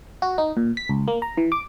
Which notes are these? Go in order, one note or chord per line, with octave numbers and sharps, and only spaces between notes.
F#4
D#4
A#2
B6
C#2
A#3
A#5
E3
D6